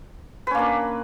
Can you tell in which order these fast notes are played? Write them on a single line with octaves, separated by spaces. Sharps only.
B4 C#4 A#3 D4